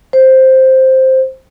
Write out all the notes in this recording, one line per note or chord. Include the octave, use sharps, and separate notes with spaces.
C5